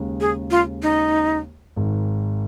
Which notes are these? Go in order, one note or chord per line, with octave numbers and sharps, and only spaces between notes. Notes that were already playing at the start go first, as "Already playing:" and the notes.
Already playing: D#2 C#3 G#3
G#4
F4
D#4
G#1 G#2 D#3